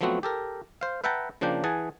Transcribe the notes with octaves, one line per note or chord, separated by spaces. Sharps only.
F3 F#3 A3 B3 C4 F#4
G4 A4 A#4
C5 F5
B4 E5 F#5 G5 A5 A#5
C#3 F3 A#3 D4 G5
E3 G#4 F#5 G#5 A5